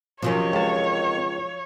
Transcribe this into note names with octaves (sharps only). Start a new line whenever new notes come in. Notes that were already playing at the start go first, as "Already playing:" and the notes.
C3 D#3 F3 F#3 C#4 C#5
C#2 A5